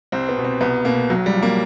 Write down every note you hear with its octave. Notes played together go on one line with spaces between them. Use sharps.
C2 C4
B3
B2
C4
C2 B3
B2 A#3
B1 F#3
G3
F3
A#3